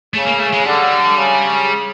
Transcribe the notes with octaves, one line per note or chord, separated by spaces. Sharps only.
C#3 A3
A#3
A3
G#3
D3 G3
C#3